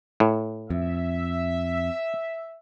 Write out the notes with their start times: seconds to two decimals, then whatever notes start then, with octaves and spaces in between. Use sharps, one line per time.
0.20 A2
0.70 F2 E5